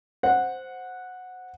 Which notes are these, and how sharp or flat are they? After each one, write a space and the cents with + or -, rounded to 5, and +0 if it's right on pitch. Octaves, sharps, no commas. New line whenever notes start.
C5 +0 F#5 -10